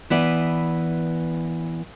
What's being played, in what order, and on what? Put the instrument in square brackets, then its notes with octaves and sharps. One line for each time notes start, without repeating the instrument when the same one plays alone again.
[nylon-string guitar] E3 B3 D5